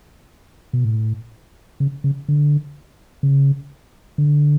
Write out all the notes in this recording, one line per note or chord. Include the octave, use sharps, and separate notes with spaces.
B2
A2
C#3
C#3
D3
C#3
D3